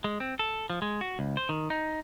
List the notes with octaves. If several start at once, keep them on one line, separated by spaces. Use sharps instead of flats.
G#3
C4
A4
F3
G#3
F#4
C#2
C5
D#3
D#4